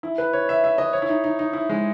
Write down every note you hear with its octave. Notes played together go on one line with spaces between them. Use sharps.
E4
B4
C#5
E5
E5
D#5
C#5
E4
D#4
D#4
D#4
E4
G#3